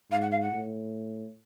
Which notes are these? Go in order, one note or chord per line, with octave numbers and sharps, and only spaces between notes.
G#2 F5
F#5
F5
F#5
A2